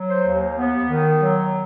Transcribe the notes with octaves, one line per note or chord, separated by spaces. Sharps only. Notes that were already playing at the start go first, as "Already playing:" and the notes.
Already playing: F#3
C5
D#2
B3
D#3
F#3